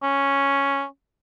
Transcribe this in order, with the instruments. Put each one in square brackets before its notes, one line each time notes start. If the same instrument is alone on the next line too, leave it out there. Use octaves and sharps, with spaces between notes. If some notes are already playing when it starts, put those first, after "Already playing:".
[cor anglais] C#4